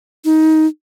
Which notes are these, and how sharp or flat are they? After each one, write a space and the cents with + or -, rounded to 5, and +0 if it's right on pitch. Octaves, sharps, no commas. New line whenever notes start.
D#4 +15